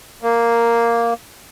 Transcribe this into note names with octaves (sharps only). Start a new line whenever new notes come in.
A#3